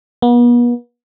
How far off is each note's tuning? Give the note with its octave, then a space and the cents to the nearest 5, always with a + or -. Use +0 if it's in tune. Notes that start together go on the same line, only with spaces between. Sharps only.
B3 -40